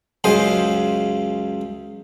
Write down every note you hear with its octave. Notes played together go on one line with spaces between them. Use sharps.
C#2 F#2 C#3 C5 D#5